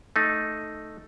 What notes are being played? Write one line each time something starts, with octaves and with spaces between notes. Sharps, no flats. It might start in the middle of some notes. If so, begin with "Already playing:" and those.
A3 D#4